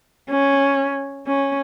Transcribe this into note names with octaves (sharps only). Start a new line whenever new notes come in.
C#4
C#4